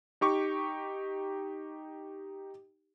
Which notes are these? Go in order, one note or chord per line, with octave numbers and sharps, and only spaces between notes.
D#4 G4 C#6 D6